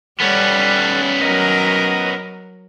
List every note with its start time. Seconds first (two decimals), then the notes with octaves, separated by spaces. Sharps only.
0.20 G3 B3 C#4 A4 F#5
1.21 F#3 A#4 D#5 A#5